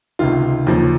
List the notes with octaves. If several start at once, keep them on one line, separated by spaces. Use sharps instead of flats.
C#2 C3 D#3 F4
D#2 C#3 F3